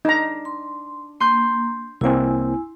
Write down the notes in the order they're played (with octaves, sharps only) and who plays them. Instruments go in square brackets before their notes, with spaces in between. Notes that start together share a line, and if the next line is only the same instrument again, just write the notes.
[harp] D4 [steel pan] D#4 A#5
[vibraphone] C6
[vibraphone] A#3 [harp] C6 G6
[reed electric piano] C2 A#3 C4 [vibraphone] E4 G#5